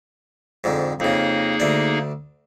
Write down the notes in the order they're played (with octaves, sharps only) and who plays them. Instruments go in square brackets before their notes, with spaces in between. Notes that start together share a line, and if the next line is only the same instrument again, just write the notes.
[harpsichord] F2 G#2 D3
[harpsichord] F2 C#3 [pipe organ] A#3 D#4 G#4
[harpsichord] D2 D4